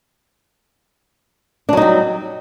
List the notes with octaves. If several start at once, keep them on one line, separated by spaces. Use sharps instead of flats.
F#3 G3 D4 D#4